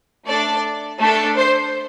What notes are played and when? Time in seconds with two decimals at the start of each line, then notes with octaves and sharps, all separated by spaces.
0.26 A3 D4 A4 D5
0.99 A3 D4 A4
1.36 C5